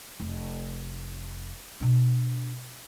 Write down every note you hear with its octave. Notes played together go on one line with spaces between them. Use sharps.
F1
B2 D4